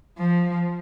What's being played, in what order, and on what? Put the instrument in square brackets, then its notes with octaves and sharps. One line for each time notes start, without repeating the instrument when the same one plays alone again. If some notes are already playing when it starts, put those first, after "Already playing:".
[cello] F3